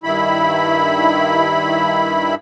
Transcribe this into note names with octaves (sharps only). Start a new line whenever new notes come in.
G2 D#3 E4 B5